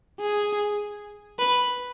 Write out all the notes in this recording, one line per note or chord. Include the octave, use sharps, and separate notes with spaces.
G#4
B4